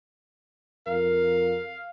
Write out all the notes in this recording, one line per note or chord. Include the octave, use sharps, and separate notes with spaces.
F2 A#4 F5